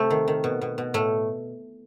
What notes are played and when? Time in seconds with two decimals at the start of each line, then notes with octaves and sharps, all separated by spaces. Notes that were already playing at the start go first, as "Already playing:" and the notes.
Already playing: C3 A3
0.10 D#3
0.28 D#3
0.44 B2
0.61 B2
0.78 B2
0.94 A2 A3